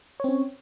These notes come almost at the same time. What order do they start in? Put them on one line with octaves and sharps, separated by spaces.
C#5 C4 C#4